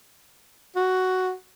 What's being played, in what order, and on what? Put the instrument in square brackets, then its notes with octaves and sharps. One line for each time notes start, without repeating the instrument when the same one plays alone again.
[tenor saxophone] F#4